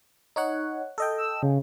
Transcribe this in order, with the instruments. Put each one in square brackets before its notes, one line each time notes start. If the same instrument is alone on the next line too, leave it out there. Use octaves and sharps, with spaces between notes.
[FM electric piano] D#4 C#5 F#5
A4 D#5 G5
[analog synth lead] E6
C#3